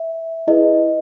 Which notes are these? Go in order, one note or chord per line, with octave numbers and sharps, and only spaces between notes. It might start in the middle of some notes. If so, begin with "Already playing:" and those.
Already playing: E5
E4 G#4 B4 D#5